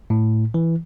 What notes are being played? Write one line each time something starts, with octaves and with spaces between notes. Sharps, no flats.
A2
E3